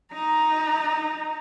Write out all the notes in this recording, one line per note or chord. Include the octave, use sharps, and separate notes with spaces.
D#4 A#5